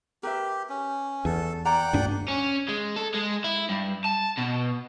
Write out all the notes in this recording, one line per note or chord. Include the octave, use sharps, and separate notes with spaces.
G4 A#4 B4 E5
C#4
E2 A4
D5 F#5 G5 A#5
D2 G2 D4
C#4
G#3
A4
G#3
E4
G2
A5
B2